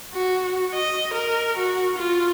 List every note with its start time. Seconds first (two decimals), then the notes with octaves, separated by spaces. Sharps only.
0.13 F#4
0.74 D#5
1.13 A#4
1.57 F#4
1.97 F4